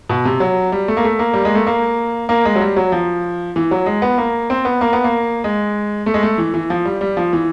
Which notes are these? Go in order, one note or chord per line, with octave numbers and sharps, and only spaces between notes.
B2
C3
F#3
G3
A3
A#3
A3
A#3
G3
G#3
A3
A#3
A#3
G#3
F#3
G3
F#3
F3
E3
F#3
G#3
B3
A#3
C4
B3
A#3
B3
A#3
G#3
A3
G#3
A3
E3
E3
F3
G3
G3
F3
E3